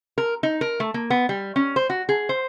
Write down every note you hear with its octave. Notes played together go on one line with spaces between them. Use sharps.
A#4
D#4
A#4
A3
A#3
B3
G3
C#4
C5
F#4
G#4
C5